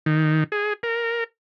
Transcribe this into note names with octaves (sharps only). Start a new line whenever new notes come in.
D#3
G#4
A#4